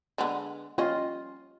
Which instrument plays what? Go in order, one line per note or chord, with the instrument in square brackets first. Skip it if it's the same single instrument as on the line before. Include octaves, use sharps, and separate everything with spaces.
[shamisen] D3 G#3 B3
[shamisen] G3 C#4 D#5 [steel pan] F4